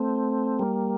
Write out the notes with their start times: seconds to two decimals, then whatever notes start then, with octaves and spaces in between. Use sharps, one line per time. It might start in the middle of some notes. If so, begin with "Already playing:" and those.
Already playing: A3 C4
0.59 G3 A#3